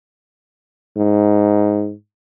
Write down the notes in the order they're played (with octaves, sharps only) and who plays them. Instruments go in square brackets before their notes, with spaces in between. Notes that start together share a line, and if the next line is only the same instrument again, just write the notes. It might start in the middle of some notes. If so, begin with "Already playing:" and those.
[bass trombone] G#2